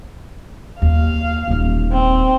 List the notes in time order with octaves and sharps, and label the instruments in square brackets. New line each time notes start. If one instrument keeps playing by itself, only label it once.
[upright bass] D#2 [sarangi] F5
[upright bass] D#1 D#4
[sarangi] C4